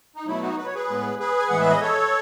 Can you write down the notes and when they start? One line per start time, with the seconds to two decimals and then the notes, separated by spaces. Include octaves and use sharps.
0.16 D#4
0.27 B2 F#3 A3 E4
0.42 D#4 F#4
0.58 B4
0.66 C#5
0.75 G#4 B4
0.89 A2 G#3 B3
1.19 G#4 B4
1.38 G#5
1.49 A2 E3 G#3 B3 F#5
1.60 E5
1.70 D#5
1.81 A4 C#5